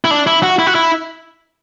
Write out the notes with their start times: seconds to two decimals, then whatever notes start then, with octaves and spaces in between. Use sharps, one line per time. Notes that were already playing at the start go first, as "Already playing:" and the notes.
0.05 E4
0.11 D4
0.27 E4
0.43 F#4
0.59 E4
0.67 F#4
0.75 E4